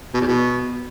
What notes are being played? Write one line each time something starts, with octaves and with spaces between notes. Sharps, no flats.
B2
E2
B2